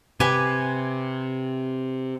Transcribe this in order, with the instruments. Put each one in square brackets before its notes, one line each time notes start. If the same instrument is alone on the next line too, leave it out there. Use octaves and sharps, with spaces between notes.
[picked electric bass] C3 [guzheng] G4 B4 G#5